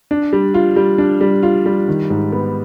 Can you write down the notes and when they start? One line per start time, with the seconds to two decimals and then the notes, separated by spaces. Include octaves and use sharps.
0.11 D4
0.33 G3
0.54 F4
0.76 G3
0.98 D4
1.21 G3
1.43 F4
1.66 G3
1.88 D#3
2.10 G#2
2.32 B3